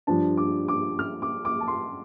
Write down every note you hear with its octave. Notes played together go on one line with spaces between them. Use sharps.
G2 F3 D4 A5
D6
D6
F6
D6
D6
A5
C6